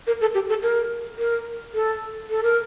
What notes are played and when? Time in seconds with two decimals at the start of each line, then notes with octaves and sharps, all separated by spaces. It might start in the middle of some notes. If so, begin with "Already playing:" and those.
0.07 A#4
0.21 A4
0.35 G4
0.49 A4
0.63 A#4
1.18 A#4
1.74 A4
2.30 A4
2.43 A#4